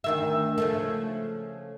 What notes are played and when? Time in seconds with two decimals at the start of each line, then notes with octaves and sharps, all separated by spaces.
0.04 D2 D#3 E5
0.58 C#3 F3 A3